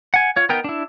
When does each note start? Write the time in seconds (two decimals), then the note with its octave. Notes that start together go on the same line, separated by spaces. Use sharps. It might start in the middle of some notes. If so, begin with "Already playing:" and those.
0.14 F#5 G#5
0.36 F4 C#5
0.49 B3 D#4 A#4 G5
0.64 D4 E4